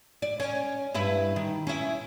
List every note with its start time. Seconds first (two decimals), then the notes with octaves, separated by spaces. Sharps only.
0.22 D5
0.40 C#4
0.94 G2 E4 B4
1.36 D#3
1.67 C#4 E4